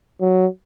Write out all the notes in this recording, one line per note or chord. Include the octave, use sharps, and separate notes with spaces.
F#3